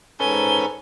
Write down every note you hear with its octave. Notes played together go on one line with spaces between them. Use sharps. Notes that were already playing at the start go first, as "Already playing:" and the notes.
G#2 C#4 A4 B4 G#5 G7